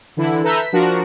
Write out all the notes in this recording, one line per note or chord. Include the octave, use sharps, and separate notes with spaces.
D3 E3 E4
A4 B4 E5 A#5 E6 G6
B6
F3 D4 F#4 A#4